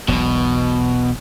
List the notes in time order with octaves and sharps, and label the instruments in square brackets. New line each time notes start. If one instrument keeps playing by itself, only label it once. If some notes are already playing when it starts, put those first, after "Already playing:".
[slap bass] E1 B1 [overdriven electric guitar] B2